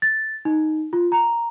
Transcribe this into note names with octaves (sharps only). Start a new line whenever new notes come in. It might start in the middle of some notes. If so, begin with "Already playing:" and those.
A6
D#4
F4
A#5